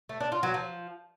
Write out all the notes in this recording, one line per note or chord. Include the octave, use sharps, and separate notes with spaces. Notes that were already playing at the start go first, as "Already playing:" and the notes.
A3
D4
F4
F#3
F3